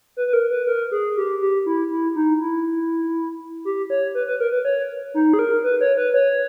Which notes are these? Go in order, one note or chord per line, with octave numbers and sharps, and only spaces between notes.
B4
B4
A#4
B4
A#4
G#4
G4
G4
E4
E4
D#4
E4
G4
C#5
B4
B4
A#4
B4
C#5
D#4
G#4
A#4
B4
C#5
B4
C#5